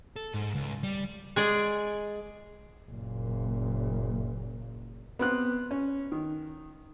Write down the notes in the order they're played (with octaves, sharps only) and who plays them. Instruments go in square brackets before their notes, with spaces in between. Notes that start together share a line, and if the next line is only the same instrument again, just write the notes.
[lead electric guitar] A4
G#2
C#2
G3
[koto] G#3 G#4 D5
[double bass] F#1 A#2
[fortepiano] B3 C4 F#6
C#4
D#3